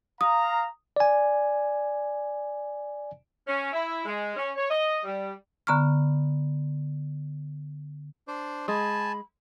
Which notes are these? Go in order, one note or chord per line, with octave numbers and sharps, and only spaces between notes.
F5 A#5 D#6
D5 G#5
C#4
E4
G#3
C#4
C#5
D#5
G3
D3 B3 A#5 C#6 F6
D4 C5 D5
G#3 G#5 A5 B5